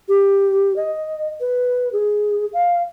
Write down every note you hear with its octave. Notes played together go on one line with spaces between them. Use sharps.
G4
D#5
B4
G#4
F5